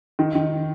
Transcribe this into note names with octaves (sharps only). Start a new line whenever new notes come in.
D#3
D#3